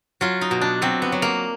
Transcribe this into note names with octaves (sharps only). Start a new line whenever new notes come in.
F#3 F4
D#4
B2
D4
F#3 C4
B3
F#3
A#3